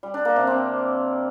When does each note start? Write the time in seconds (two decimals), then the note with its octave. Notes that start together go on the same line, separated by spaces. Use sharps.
0.03 G3
0.14 D4
0.25 A#3
0.36 C3
0.47 C4